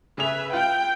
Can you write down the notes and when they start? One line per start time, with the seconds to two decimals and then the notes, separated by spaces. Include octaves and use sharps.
0.18 C#3 G#4 B4 E5 F7
0.53 F4 G5